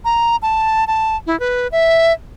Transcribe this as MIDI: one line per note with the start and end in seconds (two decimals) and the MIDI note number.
0.05 0.36 82
0.42 0.87 81
0.87 1.16 81
1.27 1.38 64
1.40 1.67 71
1.72 2.13 76